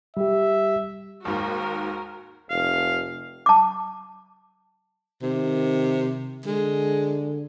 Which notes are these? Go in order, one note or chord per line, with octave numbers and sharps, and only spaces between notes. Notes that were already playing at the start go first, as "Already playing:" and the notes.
G3 G4 E5
D#2 G#2 F#4 A#4
F1 F5
A5 D6
C3 D#3
D3 G#3